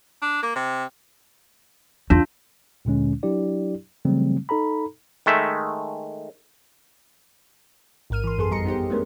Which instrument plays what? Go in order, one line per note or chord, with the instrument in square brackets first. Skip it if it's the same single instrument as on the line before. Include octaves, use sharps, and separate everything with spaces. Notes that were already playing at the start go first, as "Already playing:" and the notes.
[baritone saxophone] D4
A#3
C3
[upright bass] E2 [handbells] D4 F4
[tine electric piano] D2 A#2 D3 G#3 C#4
F#3 D4 E4 G4 D5
C#3 E3 F#3 G3 A3 C4
D#4 A4 A#5 B5
[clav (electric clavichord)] D#3 G#3 A3 E5
[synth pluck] A1 G#2 A#4 F6 D#7
E3 C6
F#2 B3 G#4 A4 C6
F2 G3 D#5 A#5 C6 C#7
B3 D#4 G4 C5
G#3 A3 B3 C#4 D4 A#4